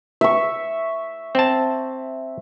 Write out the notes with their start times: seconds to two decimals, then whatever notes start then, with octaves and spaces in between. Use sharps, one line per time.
0.21 E5 C#6
1.35 C4 A5